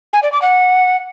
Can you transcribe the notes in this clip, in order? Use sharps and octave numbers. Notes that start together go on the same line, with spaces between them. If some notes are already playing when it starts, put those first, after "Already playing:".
G#5
D5
D6
F#5